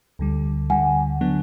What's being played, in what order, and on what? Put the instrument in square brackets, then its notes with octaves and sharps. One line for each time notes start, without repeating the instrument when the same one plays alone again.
[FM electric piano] D2 D3 G3
[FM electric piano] D2 D3 G3 [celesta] F#5 G#5
[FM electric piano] D3 F#3 B3 D4